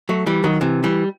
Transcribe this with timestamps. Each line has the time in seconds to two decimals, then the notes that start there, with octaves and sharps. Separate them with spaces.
0.09 F#3 A3
0.26 E3 G3
0.44 D#3 F#3
0.61 C3 E3
0.84 E3 G3